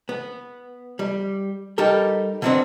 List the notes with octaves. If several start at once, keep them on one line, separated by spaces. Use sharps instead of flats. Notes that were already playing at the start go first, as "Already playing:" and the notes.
B3
G3
G3 D#4 G4 A4 A#4
D3 D#3 G#3 B3 C4 D4